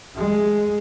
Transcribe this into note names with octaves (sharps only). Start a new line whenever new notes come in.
G#3